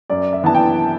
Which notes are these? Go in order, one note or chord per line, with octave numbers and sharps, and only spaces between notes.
F#2 D5
E5
E3 B3 D4 A5
G5